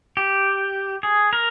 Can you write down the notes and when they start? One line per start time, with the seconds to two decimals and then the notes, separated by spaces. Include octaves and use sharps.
0.17 G4
1.03 G#4
1.33 A#4